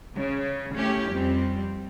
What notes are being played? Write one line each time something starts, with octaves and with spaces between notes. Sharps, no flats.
C#3
A3 C#4 E4 G4
F2 G3 C4